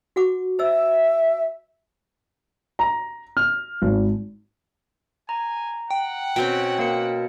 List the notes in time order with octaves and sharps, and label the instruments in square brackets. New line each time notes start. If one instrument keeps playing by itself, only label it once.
[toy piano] F#4 F#5 D6
[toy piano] C5 D#5 E6 [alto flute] E5
[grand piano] A#5
F6
G#1
[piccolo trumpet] G#5 [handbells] A#5
[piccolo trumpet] F#5 [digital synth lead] G5
[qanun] B2 C4 C#4 [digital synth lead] G5
[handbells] A#3 A#4 C#7